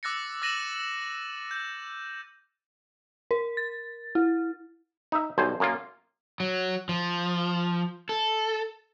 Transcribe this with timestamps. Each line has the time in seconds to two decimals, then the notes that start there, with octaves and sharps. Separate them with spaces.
0.03 D6 E6 F#6 A6 A#6 C#7
0.42 E6 A6 A#6 D#7 E7 F#7
1.51 G6
3.31 A#4
3.57 A6
4.15 E4
5.12 D#4 E5
5.38 B1 G2 C5 G#5
5.60 F#2 A#3 F4
6.40 F#3
6.89 F3
8.09 A4